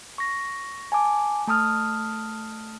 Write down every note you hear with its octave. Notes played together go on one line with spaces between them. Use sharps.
C#6 A#6
G#5 A5 D6
A3 A5 D#6 F6